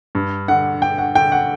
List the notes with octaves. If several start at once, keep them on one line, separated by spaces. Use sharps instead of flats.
G2
D3 F#5
G2 G5
F#5
D3 G5
F#5